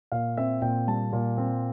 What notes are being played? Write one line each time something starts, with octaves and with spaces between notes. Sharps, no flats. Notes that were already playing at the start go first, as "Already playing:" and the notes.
A#2 F5
C4 E5
A#2 G5
G3 A5
A#2
C4